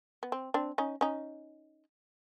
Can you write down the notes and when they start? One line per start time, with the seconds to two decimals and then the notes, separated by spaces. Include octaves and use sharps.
0.23 B3
0.32 C4
0.54 C4 D4
0.78 C#4 D#4
1.01 C#4 D#4